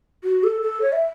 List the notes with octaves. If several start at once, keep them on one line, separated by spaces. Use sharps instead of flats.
F#4
A4
A4
C#5
E5